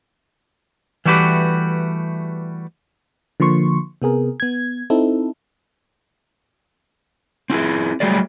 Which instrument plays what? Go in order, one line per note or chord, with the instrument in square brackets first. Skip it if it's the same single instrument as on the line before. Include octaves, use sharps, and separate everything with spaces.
[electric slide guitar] E3 G3 A3 F#4 G4 B4
[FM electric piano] D3 F3 A#3 C6 C#6
C3 B3 G#4 A#4
B3 G#6
C4 D#4 E4 A4
[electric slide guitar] C4 E4 F4 G#4
F#3 G3 A3 G#4 D5